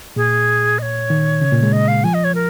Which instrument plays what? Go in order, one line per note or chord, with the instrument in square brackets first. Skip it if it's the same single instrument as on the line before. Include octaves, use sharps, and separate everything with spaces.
[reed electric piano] A#2 [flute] G#4
[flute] D#5
C#5
[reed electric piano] D#3
C#3
A#2
G#3
[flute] D#5
F5
[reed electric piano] F3 [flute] G#5
[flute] D#5
C#5
A#4